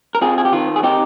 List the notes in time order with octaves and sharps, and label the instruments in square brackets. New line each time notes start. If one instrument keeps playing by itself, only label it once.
[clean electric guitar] A#4
C4 F4 G#4
G#4
G4
D#3 F4
G#4
C4 D#4 G4